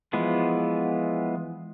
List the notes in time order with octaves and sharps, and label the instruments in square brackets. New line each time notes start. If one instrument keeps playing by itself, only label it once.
[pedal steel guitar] E3 F3 G#3 B3 F4